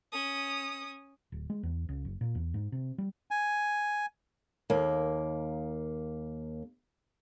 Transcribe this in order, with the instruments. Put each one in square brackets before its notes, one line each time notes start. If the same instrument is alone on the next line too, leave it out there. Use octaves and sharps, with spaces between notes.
[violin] C#4 D#6
[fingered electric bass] D1
G#3
E2
C#2
F#1
A#2
E2
G#2
C3
G3
[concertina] G#5
[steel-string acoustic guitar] D#2 A#3